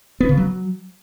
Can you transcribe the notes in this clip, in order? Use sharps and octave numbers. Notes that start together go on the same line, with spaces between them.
B3
C#3
F#3